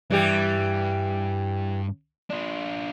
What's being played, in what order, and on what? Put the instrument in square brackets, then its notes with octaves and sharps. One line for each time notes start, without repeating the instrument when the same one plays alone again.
[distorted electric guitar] G2 [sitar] E3 G3 G4
[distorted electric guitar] D4 F4